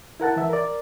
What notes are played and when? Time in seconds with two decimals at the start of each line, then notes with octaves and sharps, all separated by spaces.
0.20 E4 A#4 F#5 A5
0.36 E3 E5
0.50 A#4 D5